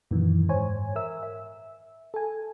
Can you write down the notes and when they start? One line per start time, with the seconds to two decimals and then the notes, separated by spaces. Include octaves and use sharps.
0.11 F#2 A#2 D#3 E3
0.49 G#2 C5 C#5 G#5
0.96 A#4 E5 E6
1.23 E5
2.14 A4 G#5